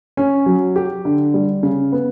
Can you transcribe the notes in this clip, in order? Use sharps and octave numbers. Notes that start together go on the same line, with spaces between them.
C#4
F#3
G4
D3
G3
C#3
B3